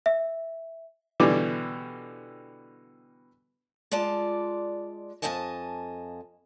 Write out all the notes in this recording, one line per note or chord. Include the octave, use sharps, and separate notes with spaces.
E5
B2 D3 E3 G3 B3 D6
G#3 F4 D5 A5
F2 G#2 A4 D#5 G#5 A5